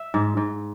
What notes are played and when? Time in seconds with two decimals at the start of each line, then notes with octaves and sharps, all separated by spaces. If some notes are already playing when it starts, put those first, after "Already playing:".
Already playing: E5
0.14 G#2
0.37 G#2